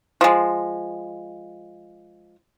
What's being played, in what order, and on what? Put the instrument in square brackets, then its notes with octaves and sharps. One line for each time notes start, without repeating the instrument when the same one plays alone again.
[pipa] F3 G#3